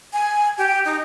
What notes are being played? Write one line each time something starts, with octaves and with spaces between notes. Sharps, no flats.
G#5
G4
D#4